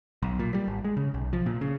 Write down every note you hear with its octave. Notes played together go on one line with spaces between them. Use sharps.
B1
A#2
G3
G#1
G#3
C#3
B1
F3
A#2
C#3